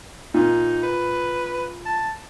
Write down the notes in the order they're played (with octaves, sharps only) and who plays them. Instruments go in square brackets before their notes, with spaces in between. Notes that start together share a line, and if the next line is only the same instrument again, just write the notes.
[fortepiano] A#2 [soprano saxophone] D#4
[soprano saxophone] B4
A5